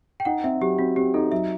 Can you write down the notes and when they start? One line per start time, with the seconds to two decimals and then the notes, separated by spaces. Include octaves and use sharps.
0.20 G5
0.25 D#4 F#5
0.44 C4 E5
0.61 F#3 G4
0.79 C4 F#4
0.96 C4 G4
1.14 D#4 A4
1.32 F#3 E5